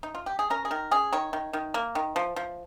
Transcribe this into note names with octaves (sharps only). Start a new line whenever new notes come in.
D#4
F4
G4
G#4
C#4 A#4
G#4
D#3 A#4
C#4 G#4
D#3 C#5
D#3
D#3
A#3
D#3
F3
F3